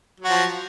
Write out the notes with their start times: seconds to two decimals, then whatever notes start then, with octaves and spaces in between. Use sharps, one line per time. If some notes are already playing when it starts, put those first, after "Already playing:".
0.20 F#3
0.25 F#4
0.29 F3